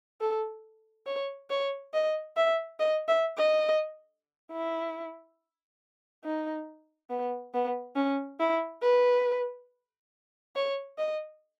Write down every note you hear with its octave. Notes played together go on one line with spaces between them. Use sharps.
A4
C#5
C#5
D#5
E5
D#5
E5
D#5
E4
D#4
B3
B3
C#4
E4
B4
C#5
D#5